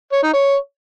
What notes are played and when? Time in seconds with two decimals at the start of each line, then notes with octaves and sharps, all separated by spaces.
0.12 C#5
0.23 D#4
0.34 C#5